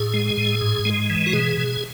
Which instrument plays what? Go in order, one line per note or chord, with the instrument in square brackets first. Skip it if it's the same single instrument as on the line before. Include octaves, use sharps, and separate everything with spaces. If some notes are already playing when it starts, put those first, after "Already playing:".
Already playing: [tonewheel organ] A2 G#4
G#3
A2
G#2
G#3
E3
F#4
B2 G#4
B2